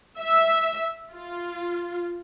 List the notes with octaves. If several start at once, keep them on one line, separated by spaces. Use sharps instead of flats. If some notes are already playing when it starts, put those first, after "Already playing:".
E5
F4